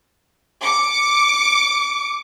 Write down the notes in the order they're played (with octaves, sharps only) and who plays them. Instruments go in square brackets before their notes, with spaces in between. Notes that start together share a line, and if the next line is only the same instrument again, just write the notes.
[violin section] D6 C#7